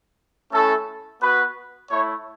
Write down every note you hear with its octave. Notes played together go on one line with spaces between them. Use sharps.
A3 C#4 E4 A4
B3 F#4 B4
A3 E4 C#5